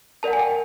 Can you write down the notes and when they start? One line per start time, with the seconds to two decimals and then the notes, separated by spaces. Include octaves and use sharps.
0.23 A#4 D5 F#5 A5
0.33 G#5
0.39 G5